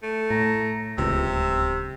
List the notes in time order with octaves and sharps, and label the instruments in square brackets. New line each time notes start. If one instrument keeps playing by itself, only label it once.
[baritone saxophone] A3
[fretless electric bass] A2 [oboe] A#5
[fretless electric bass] D1 C#2 [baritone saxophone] C3 [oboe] E6